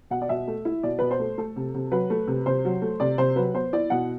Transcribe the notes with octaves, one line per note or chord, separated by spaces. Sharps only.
B2 F#5
D5
B2 E5
A3
E4
B2 D5
B2 B4
C5
A3
A3 A4
C3
C3
F#3 B4
A3
C3
C3 C5
F#3
A3
C3 D5
C3 C5
F#3 B4
B3 C5
E4 D5
B2 F#5